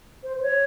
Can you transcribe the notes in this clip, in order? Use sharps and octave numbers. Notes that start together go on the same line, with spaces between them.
C5
C5
C#5